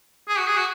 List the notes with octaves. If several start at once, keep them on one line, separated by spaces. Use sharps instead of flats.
G#4
F#4
G#4
F#4